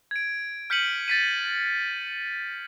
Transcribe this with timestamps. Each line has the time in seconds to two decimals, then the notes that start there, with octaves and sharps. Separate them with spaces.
0.11 G#6 D7
0.70 F6 G6 B6 C#7 D#7 F#7
1.08 A6 B6 D#7